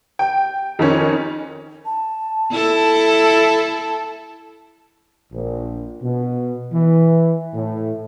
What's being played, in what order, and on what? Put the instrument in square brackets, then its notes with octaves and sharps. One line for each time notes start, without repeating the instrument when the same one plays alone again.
[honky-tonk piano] G5
F2 D#3 C#4
[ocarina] A5
[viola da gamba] E4 A4
[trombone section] A#1
B2
E3
A2